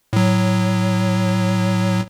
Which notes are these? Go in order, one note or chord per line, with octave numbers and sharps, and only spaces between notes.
A2 F#3